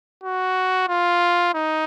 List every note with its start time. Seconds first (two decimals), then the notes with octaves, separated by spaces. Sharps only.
0.24 F#4
0.88 F4
1.54 D#4